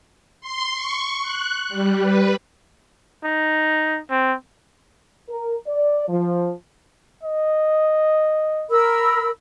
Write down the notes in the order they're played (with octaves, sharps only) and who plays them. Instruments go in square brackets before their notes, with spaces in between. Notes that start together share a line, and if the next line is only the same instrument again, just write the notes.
[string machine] C6
C#6
F#6
G3
B4
[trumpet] D#4
C4
[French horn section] A#4
D5
F3
[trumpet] D#5
[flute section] A#4 B5 E6